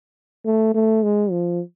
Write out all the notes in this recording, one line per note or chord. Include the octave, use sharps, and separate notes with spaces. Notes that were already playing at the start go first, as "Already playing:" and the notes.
A3
A3
G#3
F3